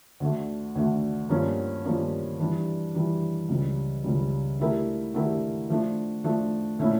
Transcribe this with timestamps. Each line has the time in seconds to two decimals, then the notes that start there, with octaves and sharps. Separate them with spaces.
0.20 D2 D3 A3
0.75 D2 D3 A3
1.29 G2 F3 A#3 C#4
1.85 G2 F3 A#3 C#4
2.39 E3 G3 D4
2.95 E3 G3 D4
3.49 C#2 C#3 G3
4.04 C#2 C#3 G3
4.59 D3 A3 E4 G4 A#4
5.14 D3 A3 E4 G4 A#4
5.70 F3 A3 D4
6.24 F3 A3 D4
6.79 A#2 A3 C#4 E4